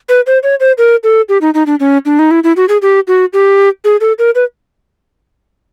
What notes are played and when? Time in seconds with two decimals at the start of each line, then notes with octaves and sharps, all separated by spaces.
0.09 B4
0.27 C5
0.43 C#5
0.60 C5
0.78 A#4
1.03 A4
1.29 G4
1.41 D#4
1.54 D#4
1.66 D4
1.80 C#4
2.06 D4
2.19 D#4
2.31 E4
2.44 E4
2.57 F#4
2.69 G#4
2.82 G4
3.08 F#4
3.33 G4
3.85 G#4
4.01 A4
4.19 A#4
4.35 B4